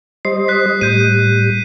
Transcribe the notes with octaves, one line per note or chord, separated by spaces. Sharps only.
G3 C5 D#5 C7
F#6 B6
A2 G3 G6 D#7